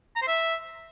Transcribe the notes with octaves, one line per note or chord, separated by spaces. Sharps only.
A#5
C5
E5